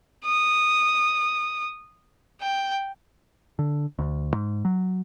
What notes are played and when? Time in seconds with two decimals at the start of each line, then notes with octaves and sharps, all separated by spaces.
0.25 D#6
2.41 G5
3.59 D3
3.99 D2
4.34 G#2
4.65 F#3